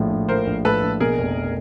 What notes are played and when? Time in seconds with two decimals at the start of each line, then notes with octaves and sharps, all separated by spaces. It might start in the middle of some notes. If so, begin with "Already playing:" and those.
Already playing: A#1 A2 F3
0.11 A#1
0.29 F3 A#4 C5
0.47 A#1
0.65 A2 A4 B4
0.82 A#1
1.00 B2 G#4 A#4
1.18 F1